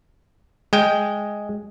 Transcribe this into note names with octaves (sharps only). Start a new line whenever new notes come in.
G#3 G5